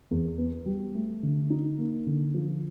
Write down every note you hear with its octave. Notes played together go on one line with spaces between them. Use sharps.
E2
B3
G3
A3
D3
D#4
A#3
D3
F3